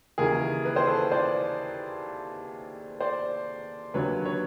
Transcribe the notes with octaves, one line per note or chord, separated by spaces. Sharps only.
D#2 C#3 E3 G#4 A#4
B4
C5
A4 B4
C5 D5
C5 D5
D#2 D3 F#3 B4 C#5
B4 C#5